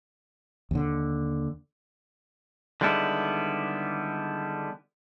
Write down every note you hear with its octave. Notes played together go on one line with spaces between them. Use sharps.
D#2 D3
D3 D#3 G3 G#3 B3 E4